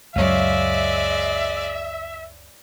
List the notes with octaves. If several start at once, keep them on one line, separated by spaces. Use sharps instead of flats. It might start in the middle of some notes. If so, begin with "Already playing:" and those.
C#2 F#2 F#3 G#3 C#5 D5 E5 F5